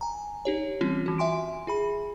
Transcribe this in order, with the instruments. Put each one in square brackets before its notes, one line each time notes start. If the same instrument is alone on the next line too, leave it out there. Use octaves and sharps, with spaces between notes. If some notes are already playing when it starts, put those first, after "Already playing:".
[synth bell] G#5 A#5
D#4 G4 C#5
E3 G3 C4 C#4 F4
E3 F#4
E5 G#5 C6 D7
F4 G#4 B5